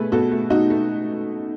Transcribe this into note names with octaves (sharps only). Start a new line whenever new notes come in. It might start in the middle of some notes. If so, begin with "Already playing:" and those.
Already playing: B2 A3 G#4 B4
B2 F#4 A4
A3
B2 D#4 F#4
A3